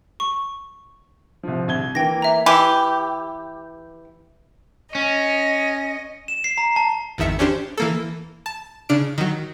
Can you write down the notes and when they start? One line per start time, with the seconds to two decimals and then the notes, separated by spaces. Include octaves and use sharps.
0.20 C#6
1.43 C2 F3
1.68 C2 G#6 G7
1.95 E3 A#3 G5 A#6
2.22 E5 A#5
2.46 E3 G4
4.95 C#4 D#5
6.28 E7
6.44 C7
6.58 A#5
6.76 A5
7.18 G#1 E2 D#3 E5 C#7
7.39 C#4 D4 G4 C5
7.78 E3 A#3 A4
8.46 A5
8.89 C#3 D4 F6 D7
9.18 D#3 F#3